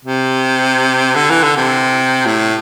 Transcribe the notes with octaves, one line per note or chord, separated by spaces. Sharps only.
C3
D3
E3
D3
C3
A2